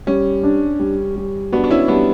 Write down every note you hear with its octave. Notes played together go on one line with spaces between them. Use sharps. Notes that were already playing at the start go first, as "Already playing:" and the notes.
G3 C#4
D4
G3
G3
B3 D4 F#4
D4
C#4 E4
G3 B3 D4